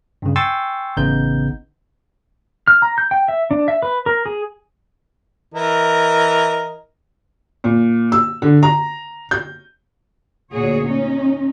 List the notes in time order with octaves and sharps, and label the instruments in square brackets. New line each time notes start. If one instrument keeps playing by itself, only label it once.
[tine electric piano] G2 C#3
G5 G#5 C6 C#6 E6 A6
A1 C#3 B3 D#4 G6
[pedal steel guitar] F6
A#5
G6
G5
E5
D4
E5
B4
A#4
G#4
[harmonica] E3 A#4 D#5
[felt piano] A#2
E6
D3
A#5
G6
[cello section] D2 A#2 F#4 G#4 C#5
C#4 D#4